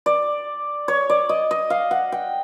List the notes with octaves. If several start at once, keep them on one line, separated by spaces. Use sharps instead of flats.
D5
C#5
D5
D#5
D#5
F5
F#5
G5